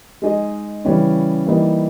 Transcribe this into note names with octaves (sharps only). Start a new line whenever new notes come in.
G#3 D#4 G#4 D#5
C#3 E3 G3 C#4
E3 G3 A#3 D#4